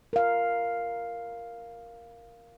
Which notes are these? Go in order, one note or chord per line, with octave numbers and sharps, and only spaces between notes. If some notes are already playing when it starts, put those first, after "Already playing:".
A#4 F5